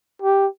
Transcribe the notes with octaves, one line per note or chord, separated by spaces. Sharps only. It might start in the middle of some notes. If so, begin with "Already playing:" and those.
G4